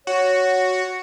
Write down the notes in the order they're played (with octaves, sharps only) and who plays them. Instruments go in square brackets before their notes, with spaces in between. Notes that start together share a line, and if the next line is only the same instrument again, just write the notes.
[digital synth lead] F#4 [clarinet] C#5